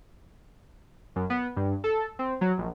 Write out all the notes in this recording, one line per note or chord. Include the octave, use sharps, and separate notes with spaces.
F#2
B3
G2
A4
C4
F#3
A#1